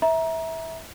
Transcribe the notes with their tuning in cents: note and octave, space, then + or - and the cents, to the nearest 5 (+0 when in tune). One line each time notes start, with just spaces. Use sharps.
E5 -15 A#5 +20